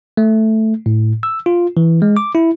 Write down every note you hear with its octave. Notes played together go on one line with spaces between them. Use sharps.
A3
A2
E6
F4
E3
G#3
D6
E4